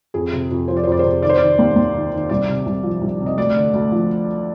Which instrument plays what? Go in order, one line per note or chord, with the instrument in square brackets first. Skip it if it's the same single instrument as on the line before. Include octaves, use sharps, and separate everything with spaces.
[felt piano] F2 G#4
C3
F2
F3 C5
D5
C5
F2 D5
C5
C3
D#3 D5
C5
D#3 D5
D#2
D#2
D#3
D#3
C2 D5
C3
C2
F3
C2
C3
D#5
D2 D5
D3
D2
F3